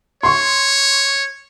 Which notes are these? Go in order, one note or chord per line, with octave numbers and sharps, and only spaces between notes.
C#5 C6 C#6